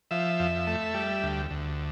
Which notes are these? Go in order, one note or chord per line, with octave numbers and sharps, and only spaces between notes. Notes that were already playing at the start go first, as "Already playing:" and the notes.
F3 E5
F2
A3
G3
D2
D2